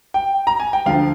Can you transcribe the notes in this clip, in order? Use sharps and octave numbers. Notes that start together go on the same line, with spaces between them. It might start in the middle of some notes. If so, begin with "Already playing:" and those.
G5
A#5
G#5
G5
D2 D3 F3 F5